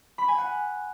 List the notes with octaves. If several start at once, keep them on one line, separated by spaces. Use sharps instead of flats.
B5
G#5
F#5